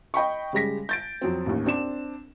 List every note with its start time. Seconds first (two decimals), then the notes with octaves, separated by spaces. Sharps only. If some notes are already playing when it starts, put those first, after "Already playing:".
0.14 D#5 G5 B5 C#6
0.53 C#3 G3 G#3 A#6 B6
0.89 G6 A6 D7
1.22 F2 F#3 C4
1.46 A1 D#2
1.66 C4 D4 E7